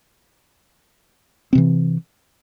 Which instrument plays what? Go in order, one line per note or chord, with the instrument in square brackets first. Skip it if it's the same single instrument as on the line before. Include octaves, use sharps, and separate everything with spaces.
[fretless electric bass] C4
C3
E3